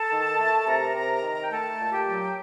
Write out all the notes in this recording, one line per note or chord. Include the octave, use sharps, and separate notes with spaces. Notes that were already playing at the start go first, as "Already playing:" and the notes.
Already playing: A4 A5
D#3
A3
C3 A#4 A#5
C3
D#3
G5
A3 A4 A5
A#2
G4 G5
F#3